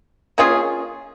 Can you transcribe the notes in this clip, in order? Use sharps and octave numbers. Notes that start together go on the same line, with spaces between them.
A#3 C#4 F4 G#4